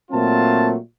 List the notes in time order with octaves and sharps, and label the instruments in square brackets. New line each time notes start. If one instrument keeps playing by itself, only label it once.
[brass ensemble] A#2 F#3 A3 C4 F4 A5